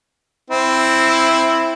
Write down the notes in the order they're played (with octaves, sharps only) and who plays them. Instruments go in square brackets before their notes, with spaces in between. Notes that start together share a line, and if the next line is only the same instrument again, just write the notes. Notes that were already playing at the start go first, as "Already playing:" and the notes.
[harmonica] C4 E4